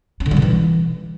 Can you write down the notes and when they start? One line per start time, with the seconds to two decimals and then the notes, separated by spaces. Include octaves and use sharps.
0.20 C#4
0.26 D3
0.31 G3
0.37 D3
0.42 E3